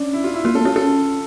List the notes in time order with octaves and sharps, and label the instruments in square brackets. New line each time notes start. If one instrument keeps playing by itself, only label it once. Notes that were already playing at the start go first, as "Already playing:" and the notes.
Already playing: [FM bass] C#4 [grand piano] D4
[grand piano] E4
F4
E4
[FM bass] A#3 [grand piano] F4
[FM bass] C#4 [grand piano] A4
[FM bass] A#3
[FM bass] C#4 [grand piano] F4
[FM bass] C#4 [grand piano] A4